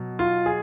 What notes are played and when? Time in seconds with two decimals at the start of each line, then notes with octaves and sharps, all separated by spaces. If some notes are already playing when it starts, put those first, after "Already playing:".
Already playing: B2 F#3
0.19 F4
0.46 G#4